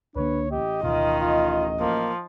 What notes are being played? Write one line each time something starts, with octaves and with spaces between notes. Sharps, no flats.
C#2 D3 A#3 D4 B4 C#5
A1 G4 D#5
D1 B2 D#3 F4
F4
F3 A#3